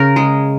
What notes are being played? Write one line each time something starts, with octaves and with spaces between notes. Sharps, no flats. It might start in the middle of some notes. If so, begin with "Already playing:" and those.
Already playing: C#3 A#4
G#3